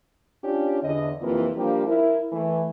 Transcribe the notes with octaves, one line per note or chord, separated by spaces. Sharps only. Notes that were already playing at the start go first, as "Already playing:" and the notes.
C#4 D4 F4 G4 C#5 D5
E2 D3 D#5
F2 C3 E3 A#3 E4 F4
F3 G3 A#3 D4 G4
E4 A#4
E3 A3